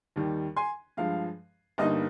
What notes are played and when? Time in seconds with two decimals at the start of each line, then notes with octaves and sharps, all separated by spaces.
0.16 D#2 D#3 G3
0.56 G#5 C6
0.97 G2 F3 G#3 F5
1.78 G1 G2 G3 A#3 D#4 D#5